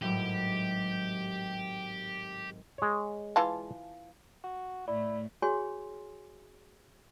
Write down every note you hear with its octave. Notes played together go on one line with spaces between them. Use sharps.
G#1 A2 F#3 G4
G#3 C#5
E3 F4 A5
F#4
A2 A3 E4 D5
F#4 G#4 C#5 G#5 C6